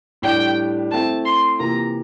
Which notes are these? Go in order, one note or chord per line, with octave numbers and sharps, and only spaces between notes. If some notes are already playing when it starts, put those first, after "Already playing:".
A2 G3 D4 G4 G5
A3 C4 E4 A5
C6
C3 E3 A#3 F4 A#5